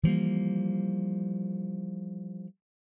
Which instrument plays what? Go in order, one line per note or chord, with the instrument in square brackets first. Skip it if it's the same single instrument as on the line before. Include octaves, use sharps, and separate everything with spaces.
[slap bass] E3 F3 G3 A#3